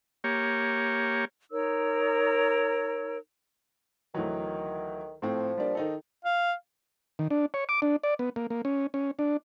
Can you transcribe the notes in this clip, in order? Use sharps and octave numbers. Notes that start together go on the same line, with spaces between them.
A#3 G4 C#5
D#4 A#4 C#5 E6
D2 D#3 E3 F#3
A2 F3 C4
G3 A#3 D4
D#3 D#4 A4
F5
D#3
D4
C#5
D6
D4
D5
B3
A#3
A#3
C#4
C#4
D4